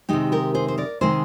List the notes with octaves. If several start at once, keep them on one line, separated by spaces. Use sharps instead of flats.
C3 D#3 G#3 D#4 G4
G4 A#4
G#4 C5
C5
A#4 D5
C3 D#3 G#3 G#4 C5